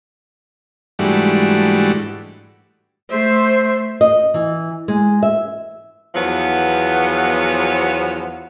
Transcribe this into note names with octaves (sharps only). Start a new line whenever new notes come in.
G#2 E3 G3 A3 D4 F#4
A3 C5 E5
D#5
E3
G#3
E5
E2 F3 F#3 B3